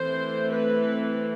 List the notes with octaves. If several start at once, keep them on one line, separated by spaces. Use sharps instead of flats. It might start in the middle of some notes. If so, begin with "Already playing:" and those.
Already playing: E3 A3 C4 C5
B4